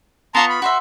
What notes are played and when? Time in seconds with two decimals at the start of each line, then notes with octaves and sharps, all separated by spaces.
0.35 B3 F4 A5 A#5 C6 C#6
0.49 B5
0.62 F#4 C5 E5